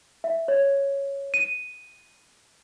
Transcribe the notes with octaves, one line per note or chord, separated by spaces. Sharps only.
E5
C#5
D#7